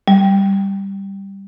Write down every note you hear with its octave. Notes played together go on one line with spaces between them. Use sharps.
G3